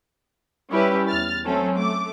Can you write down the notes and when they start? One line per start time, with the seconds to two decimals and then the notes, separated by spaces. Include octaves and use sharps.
0.70 G3 C#4 E4 G4 B4
1.07 E2 F6 A6
1.45 F#3 A3 C4 C#4 A4
1.75 A3 D6